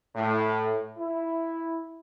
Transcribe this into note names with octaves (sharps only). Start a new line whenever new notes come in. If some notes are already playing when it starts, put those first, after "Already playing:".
A2
E4